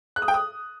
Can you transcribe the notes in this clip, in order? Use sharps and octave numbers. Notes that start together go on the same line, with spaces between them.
F#6
D#6
G5
D#6